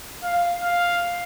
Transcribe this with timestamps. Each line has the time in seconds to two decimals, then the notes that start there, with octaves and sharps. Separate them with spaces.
0.23 F5
0.61 F5